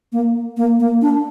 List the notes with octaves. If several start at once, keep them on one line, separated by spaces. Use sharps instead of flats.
A#3
A#3
A#3
D4